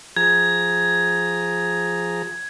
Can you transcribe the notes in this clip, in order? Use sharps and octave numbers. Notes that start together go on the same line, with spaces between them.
F3 G#4 A#5 G#6